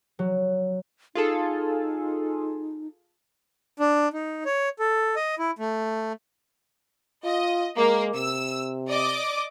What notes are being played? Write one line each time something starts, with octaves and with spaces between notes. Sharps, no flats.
F#3
D#4 F4 G#4 A4
D4
D#4
C#5
A4
D#5
E4
A3
F4 D#5
G#3 A#3
C3 E6
D5 D#5 D6